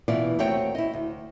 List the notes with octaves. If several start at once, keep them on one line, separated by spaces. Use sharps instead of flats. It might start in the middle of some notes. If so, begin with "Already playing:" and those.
B2 E3 B3 F4 D5
D#2 A3 C4 F#4 C#5 G5
E4 D#5
D2